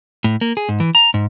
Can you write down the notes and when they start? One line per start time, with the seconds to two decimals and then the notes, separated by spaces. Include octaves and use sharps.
0.24 A2
0.41 A#3
0.57 G#4
0.69 G#2
0.80 E3
0.95 A#5
1.14 G#2